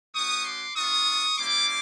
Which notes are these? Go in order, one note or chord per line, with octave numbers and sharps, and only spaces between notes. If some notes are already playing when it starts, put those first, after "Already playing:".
A3 C#4 F#4 C#6 D#6
C6 D6
B3 D4 F4 C#6 D#6
G3 A#3 C#4 E4 C6 D6